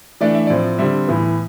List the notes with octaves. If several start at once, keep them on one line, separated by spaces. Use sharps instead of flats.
E3 A3 D4 D5
E5
A2 F3 C4 D5
D3 G3 C4 E5
A2 E3 B3